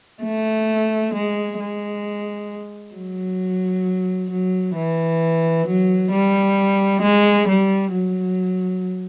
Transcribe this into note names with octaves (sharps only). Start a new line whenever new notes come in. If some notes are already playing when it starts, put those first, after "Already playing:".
A3
G#3
G#3
F#3
F#3
E3
F#3
G3
G#3
G3
F#3